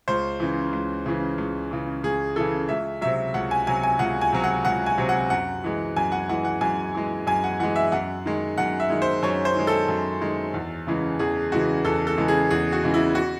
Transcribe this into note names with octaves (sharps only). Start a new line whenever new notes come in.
C#2 C5
C#3 E3
C#2
C#3 E3
C#2
C#3 E3
C#2 G#4
C#3 E3 A4
C#2 E5
C3 F#3 E5
C#2 F#5
G#5
C3 F#3 G#5
G#5
C#2 F#5
G#5
C3 F#3
F#5
C#2 F#5
G#5
C3 F#3
F#5
F#2 F#5
E3 G#3
F#2 G#5
F#5
E3 G#3 F#5
F#5
F#2 G#5
E3 G#3
F#2 G#5
F#5
E3 G#3 F#5
E5
F#2 F#5
D#3 G#3
F#2 F#5
E5
D#3 G#3
C5
F#2 C#5
C5
D#3 G#3
A4
F#2
D#3 G#3
E2
C#3 E3 G#3
E2 G#4
C#3 E3 G#3 F#4
E2 A4
A4
C#3 E3 G#3
G#4
E2 G#4
F#4
C#3 E3 G#3
E4
F#4